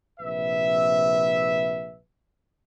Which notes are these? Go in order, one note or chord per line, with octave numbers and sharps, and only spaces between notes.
A#1 C3 B4 E5